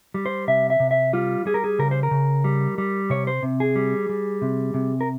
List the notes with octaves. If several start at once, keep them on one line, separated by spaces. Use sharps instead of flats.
G3
C5
C3 E5
E5
C3
E5
G3 F4
G3 G#4
A#4
G#4
C#3 A#4
C5
A#4
C#3
G3
G3
C3 C#5
C5
C3
G#4
G3
G3
C3
C3
A#4